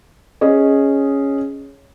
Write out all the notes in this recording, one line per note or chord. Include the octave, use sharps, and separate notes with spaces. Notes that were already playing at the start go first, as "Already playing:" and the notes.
C#4 G#4 D#5